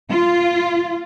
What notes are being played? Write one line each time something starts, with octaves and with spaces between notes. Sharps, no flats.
F4